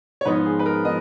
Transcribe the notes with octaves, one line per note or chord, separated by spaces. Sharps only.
C#5
G#2 F3 B3 D#4 B4
G#4
B4
A#4
F3 B3 D#4 D#5